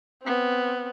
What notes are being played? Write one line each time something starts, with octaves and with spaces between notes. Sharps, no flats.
B3 C4